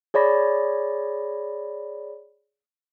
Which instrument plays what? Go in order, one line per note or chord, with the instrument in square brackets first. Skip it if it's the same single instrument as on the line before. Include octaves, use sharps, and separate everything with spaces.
[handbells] G#4 C#5 D5 B5 A#6